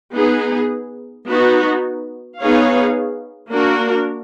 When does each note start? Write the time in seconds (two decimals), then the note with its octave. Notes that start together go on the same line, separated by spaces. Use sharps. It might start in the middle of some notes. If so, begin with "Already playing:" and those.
0.14 B3 D#4 G#4
1.27 B3 D#4 F#4
2.40 B3 D#4 G#4 C#5 F5
3.53 A#3 D4 F#4 A#4